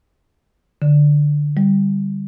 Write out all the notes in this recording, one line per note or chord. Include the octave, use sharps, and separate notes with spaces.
D3
G3